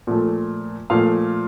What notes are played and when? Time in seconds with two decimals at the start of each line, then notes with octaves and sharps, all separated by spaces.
0.07 A#2 F3 A3
0.90 A#2 F3 A3 F5